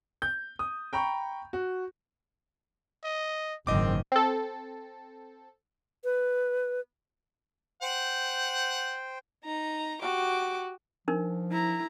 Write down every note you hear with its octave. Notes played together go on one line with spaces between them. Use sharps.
G6
D#6
G5 A#5 B5 C#6
F#4
D#5
F#1 G#2 D#3 C4 D#5 D6
C4 A4
B4
C5 F#5 G5
D#4 A#5
F#4 G4 D6
F3 D4 D#4 A#4
E4 A#5